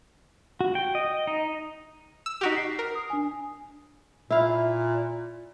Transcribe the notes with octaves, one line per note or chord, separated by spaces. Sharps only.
F#4
G5
D#5
D#4
E6
D#4 F#4 G4 B6 D7 F7
C7
A#4
D#6
D4 G#5
A#2 E4 F5